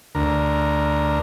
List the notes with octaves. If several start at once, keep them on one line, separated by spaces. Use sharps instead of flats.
D2 A#4